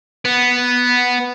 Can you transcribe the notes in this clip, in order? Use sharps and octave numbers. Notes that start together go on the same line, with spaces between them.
B3